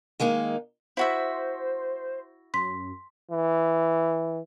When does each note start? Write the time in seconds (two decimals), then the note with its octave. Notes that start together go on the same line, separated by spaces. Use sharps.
0.20 D#3 G#3 A#3 D#4
0.97 E4 F#4 C5 E5
2.54 F#2 C6 B6
3.31 E3